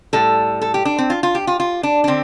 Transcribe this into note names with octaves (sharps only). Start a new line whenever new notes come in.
A2 G3 A4
A4
G4
D4
C4
F4
F4
G4
F4
F4
D4
D4
D3 C4